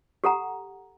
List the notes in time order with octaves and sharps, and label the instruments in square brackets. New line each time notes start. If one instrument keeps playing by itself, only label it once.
[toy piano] G4 A4 F#5 A#5